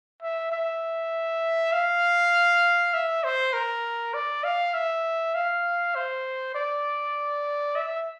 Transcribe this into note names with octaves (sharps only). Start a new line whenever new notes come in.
E5
E5
F5
E5
C5
A#4
D5
F5
E5
F5
C5
D5
E5